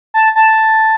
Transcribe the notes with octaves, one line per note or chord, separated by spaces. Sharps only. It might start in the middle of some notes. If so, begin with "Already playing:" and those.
A5
A5